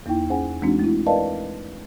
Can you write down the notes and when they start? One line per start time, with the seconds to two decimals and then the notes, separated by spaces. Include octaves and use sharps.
0.06 E2 A#3 D#4 E4 G5
0.29 C#4 G#4 C5 F#5 G#5
0.62 E3 G#3 C4 D4 D#4 F#4
0.79 A3 E4
1.06 A#4 B4 D5 D#5 F5 A5